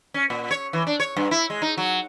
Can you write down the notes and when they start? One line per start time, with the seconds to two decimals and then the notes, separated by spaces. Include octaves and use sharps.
0.14 C#4
0.30 A#2
0.51 C#5
0.73 E3
0.87 D4
1.00 C#5
1.17 G2
1.31 E4
1.50 G#3
1.62 D#4
1.78 F#3